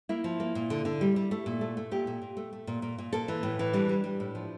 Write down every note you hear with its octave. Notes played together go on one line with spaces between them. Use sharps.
A#3 E4
F3
A#3
A#2
D3
D3
G3
G3
A3
A#2
A3
A3
A#2 G4
A#2
A#2
A3
A3
A#2
A#2
A#2
A#3 A4
E3
A2
E3
G3 D4
G3
G3
A2
F3